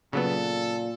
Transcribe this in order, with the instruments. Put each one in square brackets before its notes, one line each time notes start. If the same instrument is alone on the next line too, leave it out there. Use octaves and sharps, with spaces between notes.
[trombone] A#2 [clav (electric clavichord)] C#3 F#3 B3 [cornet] A4